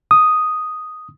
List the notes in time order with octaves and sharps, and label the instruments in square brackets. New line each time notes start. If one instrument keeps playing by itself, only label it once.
[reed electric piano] D#6